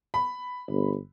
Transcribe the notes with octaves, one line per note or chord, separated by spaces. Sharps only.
B5
G1